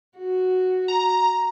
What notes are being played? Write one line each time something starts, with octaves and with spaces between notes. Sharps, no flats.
F#4
A#5